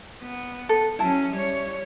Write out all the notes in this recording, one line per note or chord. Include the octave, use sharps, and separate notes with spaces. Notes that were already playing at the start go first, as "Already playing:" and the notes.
B3
A4
F#3 C#4 E4 A5
G3 C#5